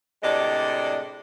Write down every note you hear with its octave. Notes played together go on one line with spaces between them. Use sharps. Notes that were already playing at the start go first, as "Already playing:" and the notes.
A2 C3 G#3 D4 D5 D#5